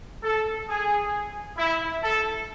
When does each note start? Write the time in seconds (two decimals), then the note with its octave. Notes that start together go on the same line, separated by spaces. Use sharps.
0.23 A4
0.68 G#4
1.57 E4
2.02 A4